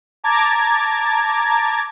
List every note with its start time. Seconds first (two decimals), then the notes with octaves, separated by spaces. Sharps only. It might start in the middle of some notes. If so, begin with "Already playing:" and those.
0.24 A5 A#5 D6 G#6 A6